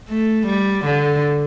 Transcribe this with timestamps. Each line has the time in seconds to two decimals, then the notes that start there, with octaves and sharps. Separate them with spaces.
0.09 A3
0.47 G3
0.85 D3